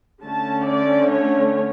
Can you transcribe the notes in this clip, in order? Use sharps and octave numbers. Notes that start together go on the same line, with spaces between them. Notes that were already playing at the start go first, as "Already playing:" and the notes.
D3 A3 C#4 A5
D5
C#5